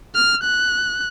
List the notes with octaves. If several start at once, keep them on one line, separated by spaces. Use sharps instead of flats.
F6
F#6